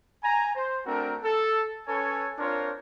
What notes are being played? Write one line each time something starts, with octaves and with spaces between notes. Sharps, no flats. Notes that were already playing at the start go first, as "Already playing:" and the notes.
G#5 A#5
C5
A3 C4 D4 F#4 A#4
A4
C#4 A4 B4 C#5 G#5
C4 D4 F4 A#4 C5 C#5